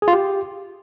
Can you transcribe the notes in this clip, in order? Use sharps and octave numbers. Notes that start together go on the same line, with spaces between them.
G#4
F4
G4